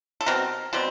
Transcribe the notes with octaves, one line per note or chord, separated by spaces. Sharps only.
A4
B2 G3 C4 A#4
B2 G3 C4